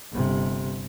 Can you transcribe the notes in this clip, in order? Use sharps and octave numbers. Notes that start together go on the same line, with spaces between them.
G1 C3